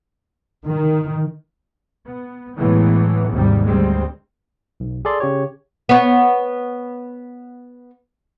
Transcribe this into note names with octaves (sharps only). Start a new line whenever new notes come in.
D#3
B3
A2 E3 F#3 G#3 A3 B3
G#1 D#2 G#2 C3 G3
D2 G3 G#3 C4
B1
G#4 A4 D5 C6
C#3 G4 C#5
B3 C#5